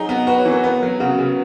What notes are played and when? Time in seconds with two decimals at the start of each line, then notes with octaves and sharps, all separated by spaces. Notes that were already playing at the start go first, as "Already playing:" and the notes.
Already playing: F#3 D#4 G#4
0.09 B3
0.27 F#4 B4
0.39 C#5
0.46 E3
0.52 A#4
0.64 B3 B4
0.82 F#3 A#4
1.00 C#3 F#4
1.19 C#3